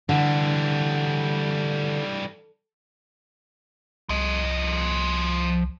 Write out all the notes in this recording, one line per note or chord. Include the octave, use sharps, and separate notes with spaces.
D3 E3 G3
C2 F3 D#5